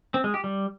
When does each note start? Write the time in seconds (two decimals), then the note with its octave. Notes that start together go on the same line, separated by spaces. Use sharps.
0.14 C4
0.24 G#3
0.34 G4
0.44 G3